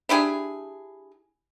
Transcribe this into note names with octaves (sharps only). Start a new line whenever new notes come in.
D4 E4 G4 G#4